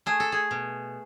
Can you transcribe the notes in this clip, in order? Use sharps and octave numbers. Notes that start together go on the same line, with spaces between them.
A3 G#4
A4
G#4
B2